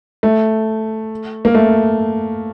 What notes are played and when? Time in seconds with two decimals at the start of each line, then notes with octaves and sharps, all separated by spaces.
0.23 A3
1.45 A#3
1.55 A3